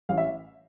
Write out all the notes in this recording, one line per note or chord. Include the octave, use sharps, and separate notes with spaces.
A1 F5
E5